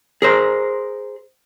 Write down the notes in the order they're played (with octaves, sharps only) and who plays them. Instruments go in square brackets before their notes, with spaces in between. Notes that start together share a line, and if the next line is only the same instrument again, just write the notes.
[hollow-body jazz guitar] G#4 A#4 C5